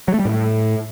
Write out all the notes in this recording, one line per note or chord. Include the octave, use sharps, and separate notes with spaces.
F#3
A3
G3
A2